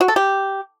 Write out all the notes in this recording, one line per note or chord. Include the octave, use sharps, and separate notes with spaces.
F#4
A4
G4